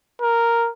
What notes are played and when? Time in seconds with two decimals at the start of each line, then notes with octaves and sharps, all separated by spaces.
0.22 A#4